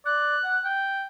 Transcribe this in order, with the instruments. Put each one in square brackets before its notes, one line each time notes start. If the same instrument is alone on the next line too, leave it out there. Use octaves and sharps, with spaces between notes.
[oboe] D5 [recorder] F#6
[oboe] F#5
G5